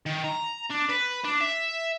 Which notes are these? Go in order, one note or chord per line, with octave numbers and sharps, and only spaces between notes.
D#3
A#5
D4
B4
D4
E5